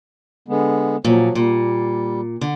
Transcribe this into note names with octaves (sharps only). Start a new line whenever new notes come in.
D3 G#3 B3
A#2 F3 F#3
A#2 G3
D3